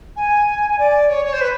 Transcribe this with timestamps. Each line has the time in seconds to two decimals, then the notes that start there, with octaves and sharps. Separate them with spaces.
0.16 G#5
0.78 D5
1.09 C#5
1.25 C#5
1.33 C5
1.40 B4